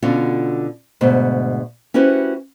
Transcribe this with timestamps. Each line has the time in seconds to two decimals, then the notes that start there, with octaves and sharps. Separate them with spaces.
0.02 B2 D3 C#4 F4 F#4
1.01 D2 G#2 B2 C5
1.94 C#4 E4 F#4 G4 B4 C5